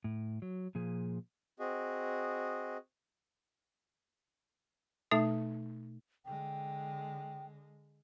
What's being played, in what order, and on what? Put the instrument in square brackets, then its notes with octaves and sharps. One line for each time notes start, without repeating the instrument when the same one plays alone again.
[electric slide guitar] A2
F#3
A#2 F3 G#4
[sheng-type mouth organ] C4 F#4 G#4 D#5
[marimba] B2 A3 D#4 A4 E5
[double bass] D3 G#3 [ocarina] G5